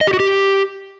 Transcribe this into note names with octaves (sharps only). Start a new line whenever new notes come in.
D#5
G4
F#4
G4